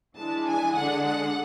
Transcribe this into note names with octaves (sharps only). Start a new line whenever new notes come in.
E3 G#3 D4 A5
G#5
D3 G#3 D4 F#5
F#5